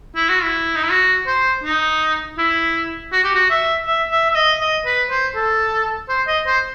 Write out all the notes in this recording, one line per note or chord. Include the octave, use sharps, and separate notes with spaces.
E4
F#4
E4
D#4
E4
F#4
C5
D#4
E4
F#4
G4
F#4
E5
E5
E5
E5
D#5
D#5
B4
C5
A4
C5
D#5
C5